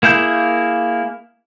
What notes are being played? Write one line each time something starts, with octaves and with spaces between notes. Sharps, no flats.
A#3 E4 G#4 G6